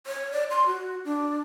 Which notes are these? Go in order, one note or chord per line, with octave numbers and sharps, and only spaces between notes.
C#5
D5
C6
F#4
D4